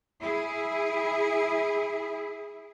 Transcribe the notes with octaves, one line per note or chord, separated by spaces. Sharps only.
E4 G#4